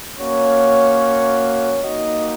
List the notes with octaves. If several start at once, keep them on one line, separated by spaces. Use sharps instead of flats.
A#3 C#4 F#4 C#5
A#3 D#4 F#4 D#5